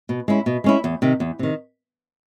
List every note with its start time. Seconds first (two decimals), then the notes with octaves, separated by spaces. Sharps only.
0.09 B2
0.28 G#3 C#4 E4
0.46 B2
0.64 G#3 C#4 E4
0.84 E2
1.02 C3 D#3
1.20 E2
1.39 C3 D#3